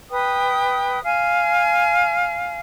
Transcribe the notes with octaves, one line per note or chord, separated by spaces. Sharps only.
B4 G5 D#6
F5 G#5